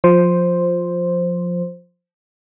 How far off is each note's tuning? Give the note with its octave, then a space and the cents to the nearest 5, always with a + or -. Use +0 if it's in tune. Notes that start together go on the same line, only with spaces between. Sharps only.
F3 +20 C5 +0